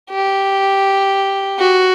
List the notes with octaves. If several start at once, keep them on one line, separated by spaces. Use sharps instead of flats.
G4
F#4